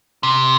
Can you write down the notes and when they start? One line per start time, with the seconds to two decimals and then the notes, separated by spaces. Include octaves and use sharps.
0.23 C3